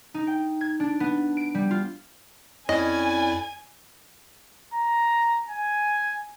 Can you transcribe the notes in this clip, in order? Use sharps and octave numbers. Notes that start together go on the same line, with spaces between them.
D#4
G5
G#6
D4
B3
D7
G3
F4
F2 C#4 E4 D5 D#5 G#5
A#5
G#5